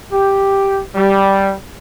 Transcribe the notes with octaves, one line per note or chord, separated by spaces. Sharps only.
G4
G3